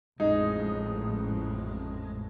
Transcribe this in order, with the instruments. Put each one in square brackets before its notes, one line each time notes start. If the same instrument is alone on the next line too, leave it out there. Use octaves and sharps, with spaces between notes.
[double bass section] A1 F2 A2 [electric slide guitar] G#3 [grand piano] D#4